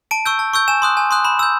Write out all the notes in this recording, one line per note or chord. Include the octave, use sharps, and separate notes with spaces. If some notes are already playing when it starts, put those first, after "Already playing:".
A5 D7
C#6 E6 G6
A5
C#6 E6 G6
G#5 E7
C6 D#6 F#6
G#5
C6 D#6 F#6
B5 E7
E6 G6